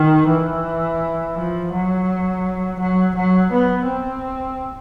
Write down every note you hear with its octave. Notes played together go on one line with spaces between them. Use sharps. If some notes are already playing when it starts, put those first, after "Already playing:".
Already playing: D#3
E3
F3
F#3
F#3
F#3
B3
C4